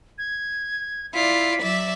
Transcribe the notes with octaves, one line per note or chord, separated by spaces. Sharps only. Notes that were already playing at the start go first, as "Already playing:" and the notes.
G#6
E4 F4 D5 B6
F#3 D5 E5